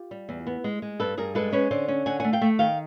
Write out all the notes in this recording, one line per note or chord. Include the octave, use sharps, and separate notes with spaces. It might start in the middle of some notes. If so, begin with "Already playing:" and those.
Already playing: F4 G4
G3
E2
B3
G#3
G#3
G2 A4 B4
G2 G#4 A#4
G#3 A4 B4
C#4 B4 C#5
D3 C5 D5
C#4
D3 F#5 G#5
A3 F#5 G#5
F5 G5
A3
D#3 F5 G5